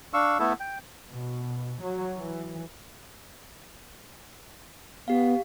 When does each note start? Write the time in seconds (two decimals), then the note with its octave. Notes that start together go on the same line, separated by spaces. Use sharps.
0.14 D4 F5 C#6 E6
0.39 A3 B3 E4 A4
0.60 G5
1.09 B2
1.81 F#3
2.15 E3
5.08 B3 G4 F5